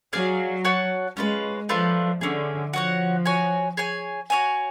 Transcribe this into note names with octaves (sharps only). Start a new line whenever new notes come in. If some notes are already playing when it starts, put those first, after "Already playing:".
F#3 G#4 D5 F5 G#5
F#4 C#5 F#5 A5
G#3 C#4 F4 B4
F3 A3 D4 F4 B4
D3 A3 C#4 G#4
F3 F#4 C#5 F#5
F#4 C#5 G#5
G#4 C#5 G#5
F#4 C#5 G#5